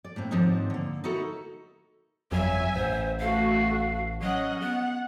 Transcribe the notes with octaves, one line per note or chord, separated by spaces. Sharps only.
D5
A2 A#3 C4
D#2 G#2 F3 C4 D4 D#4
D3 A#3
D#4 E4 F#4 A4 A#4
G1 F2 F#3 E5 G#5
A1 C5
A3 F#4 F5
F#3 C#4 D#5 F#5
B3 F#5